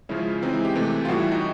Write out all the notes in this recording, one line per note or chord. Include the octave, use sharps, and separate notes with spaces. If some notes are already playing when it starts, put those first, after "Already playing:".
C#3 F3 G#3 C#4 E4
E3 G#3 C4 D#4
E4
G4
C3 E3 A3
F4
A2 E3 G3 F#4
E4
D#4